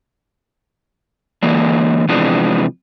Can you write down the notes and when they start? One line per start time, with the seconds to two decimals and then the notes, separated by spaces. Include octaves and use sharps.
1.43 D3 E3 G#3 A#3 D4
2.08 C3 E3 F3 G#3 B3 D4